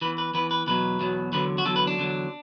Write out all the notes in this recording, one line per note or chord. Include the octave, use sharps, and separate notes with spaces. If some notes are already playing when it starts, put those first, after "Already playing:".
E2 E3 B4
B4
E2 E3 B4
B4
E2 B2 F#3 B4
E2 B2 F#3
E2 D3 F#3 B4
F#4
E2 D3 F#3 A4
B4
D4
E2 D3 F#3